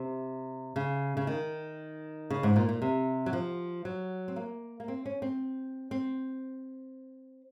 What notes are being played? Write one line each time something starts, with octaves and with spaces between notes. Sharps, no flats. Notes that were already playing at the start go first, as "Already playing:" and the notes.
Already playing: C3
C#3
C#3
D#3
C#3
G#2
A#2
A#2
C3
F#3
F3
F#3
C4
A#3
A#3
C4
C#4
C4
C4